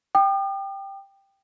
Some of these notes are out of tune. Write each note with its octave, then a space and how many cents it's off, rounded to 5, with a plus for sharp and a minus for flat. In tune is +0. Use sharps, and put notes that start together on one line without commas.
G5 +0 D#6 -45